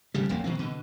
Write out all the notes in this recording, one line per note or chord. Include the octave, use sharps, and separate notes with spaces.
G1 C#3 G3
D#1 B1 F2 A#3
D#3 E3 C4
B2 D3